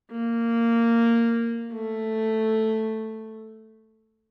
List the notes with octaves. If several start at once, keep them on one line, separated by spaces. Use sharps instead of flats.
A#3
A3